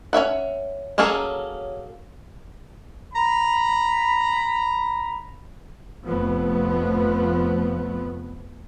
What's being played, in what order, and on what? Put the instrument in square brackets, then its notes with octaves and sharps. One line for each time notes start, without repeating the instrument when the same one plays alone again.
[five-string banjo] C#4 C#5 E5 F#5
F#3 A#3 C#4 G#4 A4
[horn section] A#5 B5
[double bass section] F1 F2 F3 A3 B3